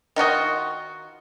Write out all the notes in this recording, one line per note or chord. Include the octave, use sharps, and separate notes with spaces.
D#3 F4 F#4 D#5